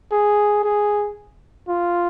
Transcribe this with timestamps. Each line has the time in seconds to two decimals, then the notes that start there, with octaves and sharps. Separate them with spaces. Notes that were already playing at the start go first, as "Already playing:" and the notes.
0.12 G#4
0.64 G#4
1.68 F4